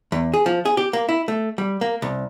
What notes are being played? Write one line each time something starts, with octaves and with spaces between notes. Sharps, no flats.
E2
G#4
F3
G#4
G4
A#3
E4
A3
G3
A#3
C2